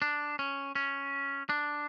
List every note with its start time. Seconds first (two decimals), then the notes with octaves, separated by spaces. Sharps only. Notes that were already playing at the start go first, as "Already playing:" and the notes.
0.02 D4
0.39 C#4
0.75 C#4
1.49 D4